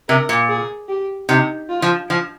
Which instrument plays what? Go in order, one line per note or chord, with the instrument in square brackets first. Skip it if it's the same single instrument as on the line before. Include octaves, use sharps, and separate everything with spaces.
[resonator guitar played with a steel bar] C3 [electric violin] A#4
[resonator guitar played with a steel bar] A#2
[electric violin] G#4
G4
[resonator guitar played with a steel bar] C3 [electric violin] D#4
[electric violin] F4
[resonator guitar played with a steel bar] F3
F3